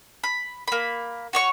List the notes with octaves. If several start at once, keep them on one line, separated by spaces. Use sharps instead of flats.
B5
A#3 B5
F#4 C#5 C#6